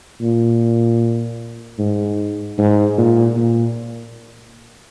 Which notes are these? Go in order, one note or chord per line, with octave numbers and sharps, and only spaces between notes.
A#2
G#2
G#2
A#2
A#2